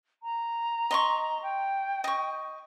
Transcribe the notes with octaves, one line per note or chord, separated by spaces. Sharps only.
A#5
D#5 C6 C#6
G5
D#5 C#6